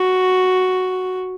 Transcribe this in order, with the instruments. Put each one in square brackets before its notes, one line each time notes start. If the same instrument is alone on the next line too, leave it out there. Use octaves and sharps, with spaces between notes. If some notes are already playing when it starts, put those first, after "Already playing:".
Already playing: [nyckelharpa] F#4